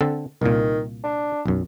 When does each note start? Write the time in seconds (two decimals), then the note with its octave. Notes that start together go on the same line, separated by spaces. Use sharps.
0.01 D3 C4 A4
0.42 C2 A#2 D#3
1.04 D4
1.46 B1 F#2